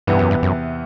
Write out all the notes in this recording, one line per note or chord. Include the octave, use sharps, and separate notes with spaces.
E2 G2 C3 E3 B3
F#2
G2
F#2